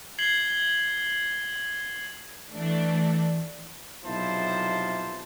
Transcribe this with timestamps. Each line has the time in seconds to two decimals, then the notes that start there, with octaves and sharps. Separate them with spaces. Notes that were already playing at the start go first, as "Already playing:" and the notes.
0.19 G#6 C7 F#7 G7
2.54 E3 A3 D4
4.05 B1 C3 F3 E4 C5 A5